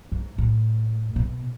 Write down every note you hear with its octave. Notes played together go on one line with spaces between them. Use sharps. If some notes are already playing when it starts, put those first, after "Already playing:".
G#2
A2
B2